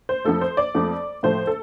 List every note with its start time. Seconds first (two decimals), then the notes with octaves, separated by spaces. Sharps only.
0.09 C5
0.25 F2 F3 A3 A4
0.41 C5
0.57 D5
0.74 F2 F3 A3
1.23 A2 F3 A3 C5
1.47 A4